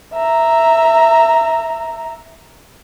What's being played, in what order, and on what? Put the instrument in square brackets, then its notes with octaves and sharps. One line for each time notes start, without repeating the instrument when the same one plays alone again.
[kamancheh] E5 A#5